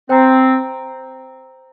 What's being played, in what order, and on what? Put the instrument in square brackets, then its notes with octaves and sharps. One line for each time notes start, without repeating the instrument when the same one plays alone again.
[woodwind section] C4 [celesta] C5 G5 A#5